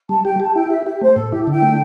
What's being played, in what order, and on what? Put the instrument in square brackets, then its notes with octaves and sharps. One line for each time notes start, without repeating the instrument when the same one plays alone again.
[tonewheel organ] G3 [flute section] A5
[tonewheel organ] G4 [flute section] G5
[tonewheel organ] G4 [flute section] A5
[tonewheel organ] E4 [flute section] G5
[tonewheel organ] G4 [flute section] E5
[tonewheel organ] G4 [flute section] E5
[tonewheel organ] A3 [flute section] C5
[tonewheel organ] A2 [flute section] A4
[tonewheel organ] E4 [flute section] G4
[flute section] A4
[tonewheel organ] D3 [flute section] G5
[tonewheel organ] A3